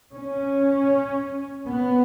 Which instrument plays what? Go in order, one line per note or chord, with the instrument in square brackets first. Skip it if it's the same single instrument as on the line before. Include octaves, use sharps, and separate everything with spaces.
[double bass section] C#4
B3